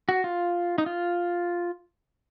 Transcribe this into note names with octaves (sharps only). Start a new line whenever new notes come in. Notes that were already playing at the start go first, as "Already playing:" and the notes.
F#4
F4
D#4
F4